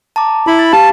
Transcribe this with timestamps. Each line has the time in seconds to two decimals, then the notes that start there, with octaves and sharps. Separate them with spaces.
0.16 A5 A#5 D6
0.47 E4 B5
0.59 A6
0.73 G4 F5 A5